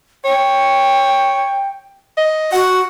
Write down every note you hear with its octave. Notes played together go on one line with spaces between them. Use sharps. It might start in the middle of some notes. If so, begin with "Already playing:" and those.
C#5 G5
D#5
F#4 F#5